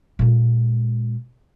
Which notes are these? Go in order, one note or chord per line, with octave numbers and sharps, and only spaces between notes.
A#2 G#3